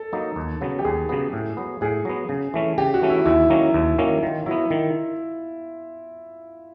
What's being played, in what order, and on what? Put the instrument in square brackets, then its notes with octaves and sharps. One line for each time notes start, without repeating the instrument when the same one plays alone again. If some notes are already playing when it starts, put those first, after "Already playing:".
Already playing: [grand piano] A4
[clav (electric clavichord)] F#3 A#3 D#4
D#2
C#3 F#3 B3
[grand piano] G4
[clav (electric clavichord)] D#2 [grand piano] G#4
[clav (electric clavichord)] C#3 F#3 B3
A2
F#3 B3
[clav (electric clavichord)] A2 [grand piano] G#4
[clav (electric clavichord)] F#3 B3
C#3
E3 A3 C#4
[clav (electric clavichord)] C#3 [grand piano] G4
[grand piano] F#4
[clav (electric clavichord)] E3 A3 C#4
[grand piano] E4
[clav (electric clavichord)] D#2 [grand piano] E4
[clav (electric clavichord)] D#3 F#3 A#3 C#4
D#2
D#3 F#3 A#3 C#4
[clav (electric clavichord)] D#3 [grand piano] F4
[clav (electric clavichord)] F#3 B3 [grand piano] E4
[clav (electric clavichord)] D#3